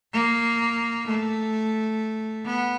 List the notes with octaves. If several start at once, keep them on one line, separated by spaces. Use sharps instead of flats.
A#3
A3
B3